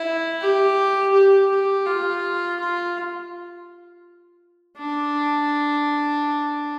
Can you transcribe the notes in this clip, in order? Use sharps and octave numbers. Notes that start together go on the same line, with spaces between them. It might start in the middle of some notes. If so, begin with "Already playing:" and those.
Already playing: E4
G4
G4
G4
F4
F4
D4